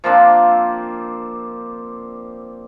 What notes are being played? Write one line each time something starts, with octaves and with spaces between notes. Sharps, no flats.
F3 A#3 C4 D4